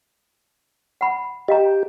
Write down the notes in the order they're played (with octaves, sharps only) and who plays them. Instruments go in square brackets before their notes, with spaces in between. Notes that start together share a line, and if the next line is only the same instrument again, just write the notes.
[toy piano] F#5 B5
[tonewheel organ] G4 [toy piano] D#5 F5 A#5